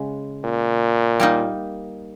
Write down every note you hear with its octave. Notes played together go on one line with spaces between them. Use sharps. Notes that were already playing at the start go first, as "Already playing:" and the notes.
Already playing: C#3 G#3
A#2
G3 A#3 D#4